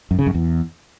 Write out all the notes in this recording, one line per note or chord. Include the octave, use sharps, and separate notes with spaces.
F#2
C#3
F#2
E2